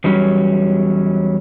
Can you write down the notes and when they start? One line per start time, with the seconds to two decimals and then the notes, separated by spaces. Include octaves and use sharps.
0.04 E2 F#3 G3 C#4